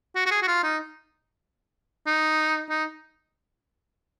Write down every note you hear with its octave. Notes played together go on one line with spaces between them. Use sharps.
F#4
F#4
G#4
F#4
F4
D#4
D#4
D#4